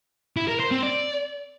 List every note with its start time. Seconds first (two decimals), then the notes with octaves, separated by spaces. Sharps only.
0.36 E4
0.48 A#4
0.60 C5
0.71 C4
0.83 D5